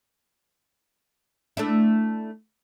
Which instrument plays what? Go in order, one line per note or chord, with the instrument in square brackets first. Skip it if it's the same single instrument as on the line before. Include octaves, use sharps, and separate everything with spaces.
[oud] A3 D4 E4